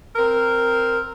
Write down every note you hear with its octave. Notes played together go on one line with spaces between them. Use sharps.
C4 A#4